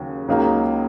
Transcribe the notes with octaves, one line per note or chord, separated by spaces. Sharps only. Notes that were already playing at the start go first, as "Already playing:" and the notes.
Already playing: D#2 C#3 F#3
C#2 C#3 F#3 A#3 D#4